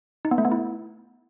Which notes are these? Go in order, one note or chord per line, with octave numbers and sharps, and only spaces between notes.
D#4
B3
A3
B3
E4